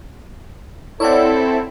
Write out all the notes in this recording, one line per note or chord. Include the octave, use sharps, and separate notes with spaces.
C4 E4 A4 C#5 D5 F#5